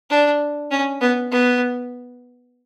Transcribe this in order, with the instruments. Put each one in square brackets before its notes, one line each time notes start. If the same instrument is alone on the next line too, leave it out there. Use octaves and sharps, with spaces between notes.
[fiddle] D4
C#4
B3
B3